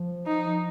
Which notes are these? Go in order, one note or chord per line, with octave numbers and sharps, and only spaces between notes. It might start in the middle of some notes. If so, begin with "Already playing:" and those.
Already playing: F3
D#4